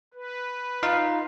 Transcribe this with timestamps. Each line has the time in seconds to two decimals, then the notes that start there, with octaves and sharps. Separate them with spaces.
0.14 B4
0.83 D#4 F4 F5